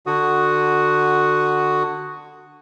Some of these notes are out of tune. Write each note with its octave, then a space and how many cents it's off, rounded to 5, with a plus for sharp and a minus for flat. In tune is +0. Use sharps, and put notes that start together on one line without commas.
D3 +20 F#4 +0 D#6 +0